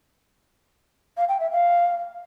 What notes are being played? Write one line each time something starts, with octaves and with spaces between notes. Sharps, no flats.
F5
G5
E5
F5